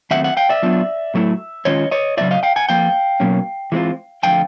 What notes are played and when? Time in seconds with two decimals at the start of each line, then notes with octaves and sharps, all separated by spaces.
0.11 D#3 F#3 A3 C4 E5 F#5
0.24 E5 F#5
0.37 F5 G5
0.49 D5 E5
0.62 F#3 B3 D4 F4
1.14 A2 F#3 A3 C#4 E4
1.65 D#3 G#3 C#4 F4 C#5 D#5
1.91 C#5 D#5
2.17 C#3 F#3 A#3 D4 F4 D5 E5
2.31 D#5 F5
2.43 F5 G5
2.56 F#5 G#5
2.69 F3 A#3 F5 G5
3.20 B2 F#3 A#3 C#4
3.72 E3 G#3 C4 F4
4.23 D3 F3 A3 F5 G5